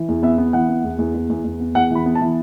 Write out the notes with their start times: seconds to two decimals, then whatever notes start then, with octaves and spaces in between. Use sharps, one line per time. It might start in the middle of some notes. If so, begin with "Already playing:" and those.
Already playing: E3
0.09 E2
0.23 B3 E5
0.38 B3
0.53 E3 F#5
0.69 B3
0.84 E2
0.98 E2
1.14 E2
1.29 E2
1.44 E2
1.60 B3
1.75 E2 F#5
1.91 E3 B5
2.06 B3
2.15 A5
2.21 E3